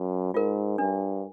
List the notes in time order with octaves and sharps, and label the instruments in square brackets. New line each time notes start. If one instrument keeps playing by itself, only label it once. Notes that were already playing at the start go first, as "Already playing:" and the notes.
Already playing: [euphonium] F#2
[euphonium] G#2 [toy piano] F4 A#4
[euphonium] G2 [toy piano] D4